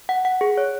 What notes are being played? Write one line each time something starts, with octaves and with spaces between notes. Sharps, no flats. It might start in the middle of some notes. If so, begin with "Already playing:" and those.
F#5
F#5
G#4
C#5